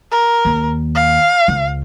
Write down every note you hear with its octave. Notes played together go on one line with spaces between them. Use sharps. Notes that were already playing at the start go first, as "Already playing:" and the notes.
A#4
D#2
F5
C#2